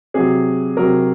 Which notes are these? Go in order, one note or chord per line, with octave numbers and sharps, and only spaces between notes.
C3 F#3 G#4
C3 F#3 A#4